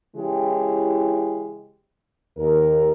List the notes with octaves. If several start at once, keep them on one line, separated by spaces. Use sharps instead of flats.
C#3 E3 G#3 E4 G4
D#2 A#4